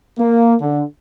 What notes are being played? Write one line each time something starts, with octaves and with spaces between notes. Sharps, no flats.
A#3
D3